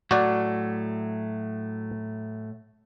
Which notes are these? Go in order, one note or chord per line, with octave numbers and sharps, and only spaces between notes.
A2 F#3 A3 F#4 D5